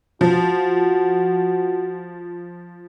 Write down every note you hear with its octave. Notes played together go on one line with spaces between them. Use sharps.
F3 F#4